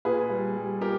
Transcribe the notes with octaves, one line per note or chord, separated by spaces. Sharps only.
A#2 G#4 B4
G3
G3
A#2 G4 A#4